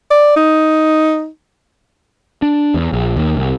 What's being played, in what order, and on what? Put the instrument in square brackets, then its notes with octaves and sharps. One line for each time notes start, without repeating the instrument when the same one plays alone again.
[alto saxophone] D5
D#4
[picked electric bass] D4
E2
A#1
D#2
C2